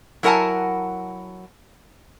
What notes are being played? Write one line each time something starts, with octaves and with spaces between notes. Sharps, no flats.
F#3 E4 A#4 F#5 G#5 A5